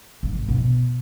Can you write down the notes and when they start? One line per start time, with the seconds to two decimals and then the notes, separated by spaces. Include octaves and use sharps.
0.23 G#1
0.49 B2